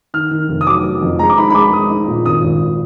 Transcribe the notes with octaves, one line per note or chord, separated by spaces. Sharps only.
D#3 F6
D#3
F1
D#6
F#3 D6
F#3
F2
G#3 A#5
D6
D#4 B5
B5
G#3 D6
G#3 D#6
D#4
A#2
G#1 D#6
G#1